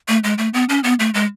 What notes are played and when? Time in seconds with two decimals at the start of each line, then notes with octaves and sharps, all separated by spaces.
0.08 A3
0.24 G#3
0.38 A3
0.54 B3
0.69 C#4
0.84 B3
0.99 A3
1.14 G#3